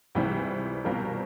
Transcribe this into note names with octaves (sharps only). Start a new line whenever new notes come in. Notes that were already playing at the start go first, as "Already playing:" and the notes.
C#2 C3 E3 G3 C4
B2 G3 C4 F4 A#4